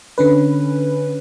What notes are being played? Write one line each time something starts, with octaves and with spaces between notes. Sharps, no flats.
D3 C#4 B4